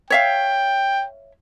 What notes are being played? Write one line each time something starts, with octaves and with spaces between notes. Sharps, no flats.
C#5 E5 F5 G5